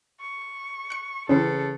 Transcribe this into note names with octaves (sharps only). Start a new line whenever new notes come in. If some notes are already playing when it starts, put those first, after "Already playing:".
C#6
F#6 C#7
C#3 E3 C4 C#4 A4